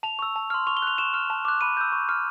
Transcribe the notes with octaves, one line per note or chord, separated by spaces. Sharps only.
A5 F7
C#6 E6
A5
C6 F6
C#6 F7
G7
F#6 F7
C#6 E7
F6
A5
D6 F#6
B5 D#7
E6 G6
C#6
F6